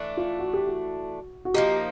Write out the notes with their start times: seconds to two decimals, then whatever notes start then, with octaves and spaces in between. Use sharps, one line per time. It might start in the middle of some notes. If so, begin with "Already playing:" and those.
Already playing: E3 A3 D4
0.17 F4
0.39 F#4
0.54 G4
0.67 F#4
1.45 F#4
1.54 F3 A#3 D#4 G4